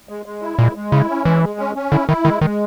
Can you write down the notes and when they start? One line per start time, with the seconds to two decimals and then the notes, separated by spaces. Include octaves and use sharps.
0.09 G#3
0.26 G#3
0.42 E4
0.58 A#2 G#3
0.75 G#3
0.92 C#3 E4
1.09 C#4
1.25 E3 G#3
1.42 G#3
1.59 C#4
1.76 C#4
1.92 D3 E4
2.08 D#3 E4
2.25 D#3 G#3
2.41 D#3 G#3